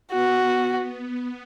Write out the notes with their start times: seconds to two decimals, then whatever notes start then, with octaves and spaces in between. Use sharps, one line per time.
0.12 B3 F#4